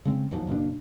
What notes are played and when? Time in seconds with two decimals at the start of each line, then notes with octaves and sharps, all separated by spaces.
0.05 C#3 G#3 C4
0.31 D#2 G#2 F3 F#3
0.47 F#1 B2 A#3 D4